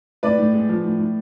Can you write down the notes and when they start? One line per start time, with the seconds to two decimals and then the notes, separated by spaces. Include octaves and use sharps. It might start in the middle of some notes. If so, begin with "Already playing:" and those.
0.23 A2 B4 D5
0.39 A2
0.54 G#3
0.69 F3
0.84 A2
0.99 A2